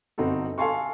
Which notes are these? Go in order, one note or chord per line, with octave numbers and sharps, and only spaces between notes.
G1 C4 D#4 F#4 A4
A4 F5 G#5 A5 C6 C#6